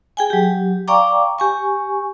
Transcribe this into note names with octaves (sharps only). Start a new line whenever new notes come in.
G#4 G5 G#5
F#3 G4
D5 F5 G5 A#5 C#6 D6
G4 G#5 C#6